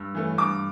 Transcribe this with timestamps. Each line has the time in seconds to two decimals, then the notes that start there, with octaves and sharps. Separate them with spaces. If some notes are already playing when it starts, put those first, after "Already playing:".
Already playing: G2 E6
0.15 E3 A3 C#4
0.38 G2 D6